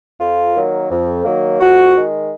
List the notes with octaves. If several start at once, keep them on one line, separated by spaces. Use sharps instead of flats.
F2 F4
D#3 F#3 A#3
F2
D#3 F#3 A#3
F2 F#4
D#3 G#3